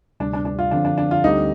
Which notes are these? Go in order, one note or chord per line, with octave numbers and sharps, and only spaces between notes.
D2 C3 G3 D4
D4
D4
F4
D3 F3 C4 D4
D4
D4
F4
D2 D3 G3 C4 D#4 G4